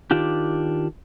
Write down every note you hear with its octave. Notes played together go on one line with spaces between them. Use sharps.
D#3 D4 F4 G4